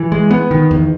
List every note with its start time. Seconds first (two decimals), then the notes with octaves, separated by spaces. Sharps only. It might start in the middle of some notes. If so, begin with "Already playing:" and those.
Already playing: E3
0.12 G#3
0.31 B3
0.51 D#3
0.71 E2